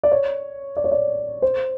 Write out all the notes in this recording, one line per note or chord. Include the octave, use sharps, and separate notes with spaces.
D5
C#5
D5
C#5
D5
C5